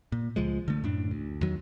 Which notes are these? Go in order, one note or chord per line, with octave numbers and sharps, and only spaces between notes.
A#2
C#2 F3 G#3
D3 A3
F#2 A2 D4
D2
E2 D#3 F#3